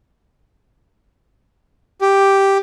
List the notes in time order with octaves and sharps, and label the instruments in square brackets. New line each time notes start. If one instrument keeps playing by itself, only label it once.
[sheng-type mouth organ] G4